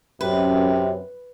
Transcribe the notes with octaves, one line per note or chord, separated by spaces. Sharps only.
F#2 C3 B4